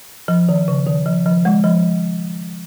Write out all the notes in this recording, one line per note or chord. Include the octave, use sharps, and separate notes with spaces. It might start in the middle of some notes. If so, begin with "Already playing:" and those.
F3
D#3
C#3
D#3
F3
F3
G#3
F3